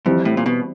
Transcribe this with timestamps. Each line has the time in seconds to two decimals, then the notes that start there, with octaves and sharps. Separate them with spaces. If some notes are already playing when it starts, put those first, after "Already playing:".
0.06 F2 E3 G3 C4
0.25 A2
0.37 A#2
0.46 B2